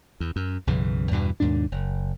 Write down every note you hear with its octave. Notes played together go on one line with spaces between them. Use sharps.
E2
F#2
B1 F#2 C#3 E3
E2 G2 B2 E3
D#2 G#2 B2 D4
F#1